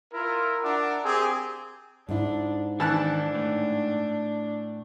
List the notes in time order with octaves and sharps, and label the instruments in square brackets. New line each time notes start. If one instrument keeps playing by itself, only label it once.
[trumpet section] E4 F4 A#4
D4 A#4 E5 F#5
C4 G4 G#4
[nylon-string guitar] G#2 E4 [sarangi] D4
[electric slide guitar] D#3 [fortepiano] E3 A5 F#6 [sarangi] D4
[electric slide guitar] A2